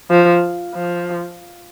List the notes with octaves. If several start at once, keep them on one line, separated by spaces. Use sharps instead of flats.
F3
F3